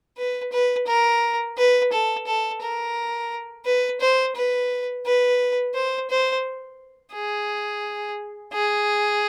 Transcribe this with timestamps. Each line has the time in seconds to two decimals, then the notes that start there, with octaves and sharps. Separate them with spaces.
0.18 B4
0.52 B4
0.87 A#4
1.57 B4
1.92 A4
2.27 A4
2.61 A#4
3.65 B4
4.00 C5
4.36 B4
5.05 B4
5.74 C5
6.10 C5
7.13 G#4
8.53 G#4